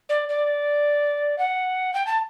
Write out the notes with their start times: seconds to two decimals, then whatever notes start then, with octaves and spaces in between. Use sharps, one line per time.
0.09 D5
0.29 D5
1.38 F#5
1.94 G5
2.07 A5